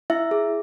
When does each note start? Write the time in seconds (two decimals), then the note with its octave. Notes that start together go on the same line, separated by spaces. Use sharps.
0.10 E4 E5
0.31 G#4